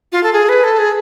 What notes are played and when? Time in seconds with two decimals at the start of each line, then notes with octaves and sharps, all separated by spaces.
0.12 F4
0.23 A4
0.33 G#4
0.49 B4
0.64 A4
0.78 G#4